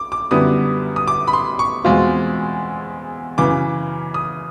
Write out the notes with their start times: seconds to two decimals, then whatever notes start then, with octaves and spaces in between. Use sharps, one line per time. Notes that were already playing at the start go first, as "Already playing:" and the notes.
Already playing: D6
0.12 D6
0.31 F#2 D3 G3 B3 E4 D#6
0.96 D#6
1.08 D6
1.27 B5
1.33 C6
1.59 C#6
1.85 E2 B2 G#3 C4 F4
3.38 F#2 C#3 E3 D6
4.14 D#6